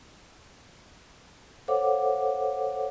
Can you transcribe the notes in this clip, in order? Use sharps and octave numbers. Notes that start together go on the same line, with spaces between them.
A4 C5 C#5 F5 F#5 D6